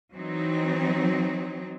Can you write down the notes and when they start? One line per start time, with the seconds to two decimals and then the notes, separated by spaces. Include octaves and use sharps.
0.15 E3 F#3 C4 D#4